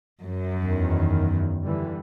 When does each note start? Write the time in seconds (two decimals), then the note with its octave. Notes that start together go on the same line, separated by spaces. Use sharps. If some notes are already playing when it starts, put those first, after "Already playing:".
0.24 F#2
0.64 E2 D#3
1.63 D3 E3 G3